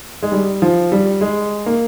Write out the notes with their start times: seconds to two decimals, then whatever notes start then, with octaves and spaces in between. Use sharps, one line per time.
0.22 G#3
0.32 G3
0.62 F3
0.92 G3
1.21 G#3
1.66 A#3